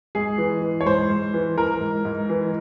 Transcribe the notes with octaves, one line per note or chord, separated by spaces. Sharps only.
G#2 G#4
E3
E3
C#5
G#2 C5
G#2
E3
E3 A#4
G#2
G#2
E3